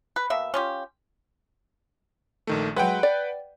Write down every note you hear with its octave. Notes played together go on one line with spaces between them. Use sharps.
B4
B2 A#3 E5
C#4 F4 G4
A#1 D#3 A3
F#3 G#3 B4 F#5 G5
D5